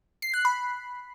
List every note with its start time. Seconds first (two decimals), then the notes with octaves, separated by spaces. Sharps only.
0.22 C7
0.34 F#6
0.45 B5